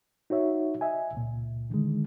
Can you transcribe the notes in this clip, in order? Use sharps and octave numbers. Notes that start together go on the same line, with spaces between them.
D#4 F#4 C#5 E5
D#5 E5 G#5
C#2 A#2
D3 D#3 G#3